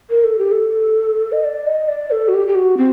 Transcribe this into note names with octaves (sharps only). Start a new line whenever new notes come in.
A#4
A4
G4
A4
D#5
D5
D#5
D5
A4
F#4
G4
G4
F#4
C4